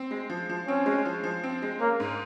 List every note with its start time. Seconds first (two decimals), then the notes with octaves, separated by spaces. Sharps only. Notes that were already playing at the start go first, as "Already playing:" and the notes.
Already playing: C4
0.11 G#3
0.30 F3
0.49 F3
0.67 C4 C#4
0.86 G#3
1.05 F3
1.24 F3
1.43 C4
1.62 G#3
1.80 A#3 C#4
2.00 G#2